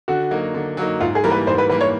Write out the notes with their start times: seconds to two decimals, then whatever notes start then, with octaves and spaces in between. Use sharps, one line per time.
0.08 D3 F#4
0.31 F#3 A#3 D#4
0.54 D3
0.77 F#3 A#3 D#4
1.00 G#2 F4
1.15 G#4
1.24 E3 G3 A#3 A#4
1.31 B4
1.47 G#2 C5
1.58 B4
1.69 E3 G3 A#3 B4
1.81 C#5